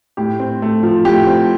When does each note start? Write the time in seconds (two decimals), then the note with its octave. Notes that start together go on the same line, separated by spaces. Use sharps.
0.17 A2 G4
0.40 C4
0.62 A3
0.83 F3
1.05 A2 G4
1.27 C4